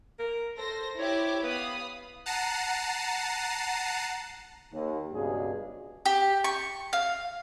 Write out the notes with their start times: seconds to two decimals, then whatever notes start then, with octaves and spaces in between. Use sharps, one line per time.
0.19 A#4
0.58 A4 C5 A#6
0.99 E4 G4 C#5 D6
1.43 B3 F5 B5 D#6
2.26 F#5 A5 A#5 C7 D#7
4.72 D#2
5.13 C#2 G2 B2 G#4
6.06 G4
6.44 C#6
6.93 F5